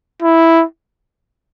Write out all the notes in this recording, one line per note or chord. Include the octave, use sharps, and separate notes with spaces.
E4